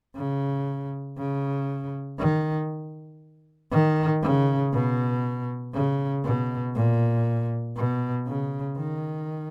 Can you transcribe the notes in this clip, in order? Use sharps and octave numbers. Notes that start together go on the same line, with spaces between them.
C#3
C#3
D#3
D#3
C#3
B2
C#3
B2
A#2
B2
C#3
D#3